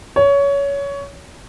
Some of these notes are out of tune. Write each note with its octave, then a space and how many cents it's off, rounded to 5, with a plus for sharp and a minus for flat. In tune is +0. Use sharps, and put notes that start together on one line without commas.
C#5 +20